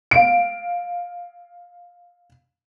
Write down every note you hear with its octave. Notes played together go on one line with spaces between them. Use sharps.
F5 D7